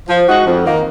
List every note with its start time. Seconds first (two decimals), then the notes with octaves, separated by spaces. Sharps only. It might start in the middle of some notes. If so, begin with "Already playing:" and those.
0.09 F3
0.28 G#3 D#4 F#4
0.46 F2
0.64 D#3 A#3